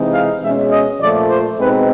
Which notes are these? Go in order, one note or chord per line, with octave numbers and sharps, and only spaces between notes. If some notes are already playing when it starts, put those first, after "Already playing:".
Already playing: C3 E3 G#3 C4 D#4
F5
B2 G#3 C#4 E5
D#5
A#2 F3 A3 D5
C5
B2 G#3 C4 D#4 B4